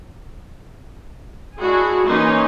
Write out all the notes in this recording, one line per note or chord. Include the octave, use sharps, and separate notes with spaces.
G#3 D4 E4 F#4 G#4
E3 A#3 C#4 D#4 C6